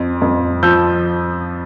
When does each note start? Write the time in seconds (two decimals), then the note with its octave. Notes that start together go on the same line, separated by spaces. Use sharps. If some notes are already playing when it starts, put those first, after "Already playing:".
Already playing: F2
0.22 F2
0.63 F3 E6 G6